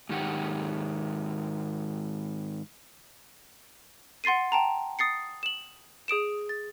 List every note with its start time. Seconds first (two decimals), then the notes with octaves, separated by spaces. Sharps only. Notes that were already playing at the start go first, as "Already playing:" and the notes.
0.09 G#2 D#3 G4 F#5
4.24 F#5 C6 A6 C7 D#7
4.52 G5 A5 A#5
4.99 D#6 A6 C7 C#7
5.43 E7 F#7
6.08 G#4 D#6 D7 E7
6.49 A6